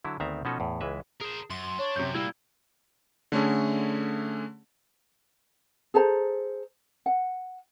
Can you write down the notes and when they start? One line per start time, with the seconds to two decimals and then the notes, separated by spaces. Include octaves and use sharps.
0.05 D3 F#3 E4
0.20 D2 D#3 B3 C4 E5 A#5
0.45 B2 F3 C#4 D#4 F#4 A4
0.60 E2 A2
0.81 C#2 E3 G#3 B4 E5
1.21 G#4 A#4 C5
1.50 F#2 C6
1.78 D4 C#5
1.96 F#2 C3 G6
2.14 G3 A#3 E4 F4 E6
3.32 D3 A3 C#4 G#4
5.94 G#4 A4 C5 A#5
7.06 F#5